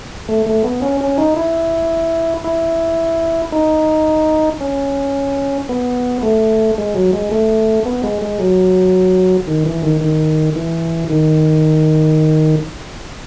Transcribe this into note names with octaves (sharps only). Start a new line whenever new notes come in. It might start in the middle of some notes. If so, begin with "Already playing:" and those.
A3
A3
B3
C#4
C#4
D#4
E4
E4
D#4
C#4
B3
A3
G#3
F#3
G#3
A3
B3
G#3
G#3
F#3
D#3
E3
D#3
D#3
E3
D#3